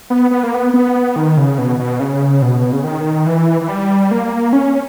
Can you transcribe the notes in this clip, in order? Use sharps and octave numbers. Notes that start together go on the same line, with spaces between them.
B3
B3
A#3
B3
B3
D#3
C#3
B2
B2
C#3
B2
C#3
D#3
E3
E3
G3
A#3
C#4